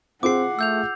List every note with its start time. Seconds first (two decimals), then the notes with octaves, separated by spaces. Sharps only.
0.23 C4 F4 G#4 F#5 D6 C7
0.59 A3 E6 G6 F7